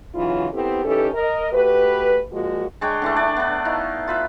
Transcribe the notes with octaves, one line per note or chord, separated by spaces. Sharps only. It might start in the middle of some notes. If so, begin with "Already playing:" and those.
C#3 E3 F#3 D#4 F4
B3 C4 E4 G4 A4
E3 C#4 D#4 G4 A4
A#4 D#5
A3 F#4 G4 B4
A#2 F3 G#3 A#3 F4 F#4
G#3 D4 C#5 G5
D3 E3 A3
D4 C#5 D5
B3 D4
D#4 E4 F5
F4 B4 E5